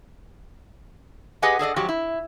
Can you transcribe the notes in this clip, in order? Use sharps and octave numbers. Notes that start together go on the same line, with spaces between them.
G4 G#4 B4 D#5 F#5 G#5
G#4 A4 D5 D#5
G#2 F3 F#3 F#4 G4
E4